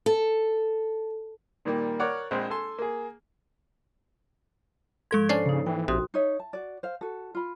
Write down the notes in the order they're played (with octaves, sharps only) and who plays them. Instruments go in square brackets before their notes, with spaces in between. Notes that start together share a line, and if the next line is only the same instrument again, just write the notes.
[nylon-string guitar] A4
[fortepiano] A#2 D#3 G3 A#3
A#4 C#5 D5 F#5
A#1 A#2 G#3 C4
A4 G#5 C6
A#3 G#4
[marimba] G#2 F3 [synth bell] G#3 A4 G#6
[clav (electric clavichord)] C#4 D4 D5 [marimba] A4 C5 [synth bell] C7
[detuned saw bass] C#3 [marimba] A#3 D#4
[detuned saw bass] E3 [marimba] G5
[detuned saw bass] A#1 [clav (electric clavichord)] C3 [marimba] F#4 C6 D#6
[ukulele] D#4 C#5 E5
A5
F#4 D5
C5 F5
F#4 A4
F4 B5